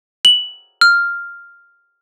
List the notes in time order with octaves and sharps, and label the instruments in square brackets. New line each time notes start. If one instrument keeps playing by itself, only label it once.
[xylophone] F#7
F6